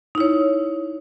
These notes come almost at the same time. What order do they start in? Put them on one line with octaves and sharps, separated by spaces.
D#4 E4 C#5